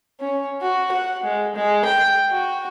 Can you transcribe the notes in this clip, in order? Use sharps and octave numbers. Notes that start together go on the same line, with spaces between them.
C#4
F#4
F#5
G#3
G#3
G5
F#4